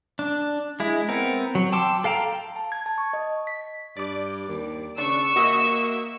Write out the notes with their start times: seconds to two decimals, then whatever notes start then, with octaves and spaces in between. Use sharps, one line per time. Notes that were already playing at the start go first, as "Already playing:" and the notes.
0.19 D4
0.80 G#3 E4
1.09 B3 C4 A#4
1.55 F#3
1.72 G5 A5 C6 D6 E6
2.04 A4 F5 G5 A#5
2.56 A5
2.72 G#6
2.86 A5
2.98 C#6
3.13 D#5
3.47 B6
3.97 G2 D5 D6
4.48 D#2
4.98 C#3 D4 C#6 E6
5.36 A#3 F#4 D#5 E5